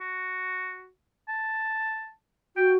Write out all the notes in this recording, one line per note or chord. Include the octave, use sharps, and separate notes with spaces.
F#4
A5
F#4 G5